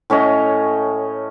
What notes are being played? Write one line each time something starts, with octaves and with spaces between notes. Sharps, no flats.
A2 C#4 C#5 D#5